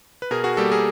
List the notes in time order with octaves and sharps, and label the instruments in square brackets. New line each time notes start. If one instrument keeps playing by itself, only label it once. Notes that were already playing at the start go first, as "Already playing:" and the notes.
[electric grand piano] B4
B2 G#4 A#4
F#4 G#4
G3 A#3 G4 A4
G#4 A#4